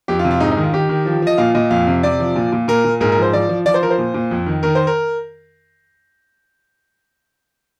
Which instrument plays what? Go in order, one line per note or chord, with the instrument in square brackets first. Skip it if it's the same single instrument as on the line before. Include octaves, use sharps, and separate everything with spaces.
[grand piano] F2 G4
F4
C3
F4
G#2 D#4
D#4
D#3
F4
D#3 G4
D#3
F3
F3 D#5
A#2 F5
A#2 D#5
F2 F5
C3
C3 D5
F3
A#2
A#2
A#2 A#4
A#2
G#2 A#4
A#4
F3 C5
F3 D5
F3
F3 D5
C5
F3 A#4
C5
A#2
A#2
F2
D#3
D#3 A#4
C5
A#4